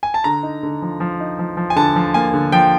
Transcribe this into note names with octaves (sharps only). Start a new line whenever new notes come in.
G#5
A5
D3 A#5
D#4
D3
F3
F3
D#4
F3
F3
G#5
D3 A5
F3
A#3 G#5
D3
F3 G5